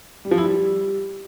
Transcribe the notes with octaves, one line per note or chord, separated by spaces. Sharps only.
G3
F3
E4
G3